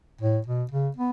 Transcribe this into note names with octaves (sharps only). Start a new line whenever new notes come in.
A2
B2
C#3
B3